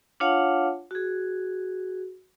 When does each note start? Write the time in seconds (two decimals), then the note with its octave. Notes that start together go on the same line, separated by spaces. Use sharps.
0.20 D4 F4 C#5 F5 F#5 A5
0.91 F#4 G#4